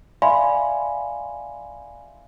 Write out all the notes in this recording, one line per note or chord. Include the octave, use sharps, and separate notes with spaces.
D5 E5 F5 G#5 B5 C6